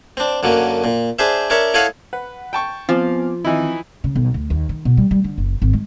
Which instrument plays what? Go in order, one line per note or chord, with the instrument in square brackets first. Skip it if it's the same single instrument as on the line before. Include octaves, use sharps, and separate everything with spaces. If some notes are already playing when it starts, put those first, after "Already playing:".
[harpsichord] C4 D4
F#2 D3 F#3 A#3
A#2
D4 G#4 C5 E5
D4 A#4 C#5 E5
E4 A4 C#5 D#5 F5 F#5
[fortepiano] B4 [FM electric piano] F#5
[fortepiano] G5 A5 C#6
[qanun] F3 [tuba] B3 [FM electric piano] C4 G#5 D6 [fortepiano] F5
[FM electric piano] D#3 [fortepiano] E3 D#4 E4 [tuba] C4
[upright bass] C#3
B1
D2
D#2
D#3
B2
G3
G3
D3
F#1
G#1
G#3